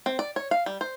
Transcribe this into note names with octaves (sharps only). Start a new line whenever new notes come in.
C4
D5
C#5
F5
G3
C5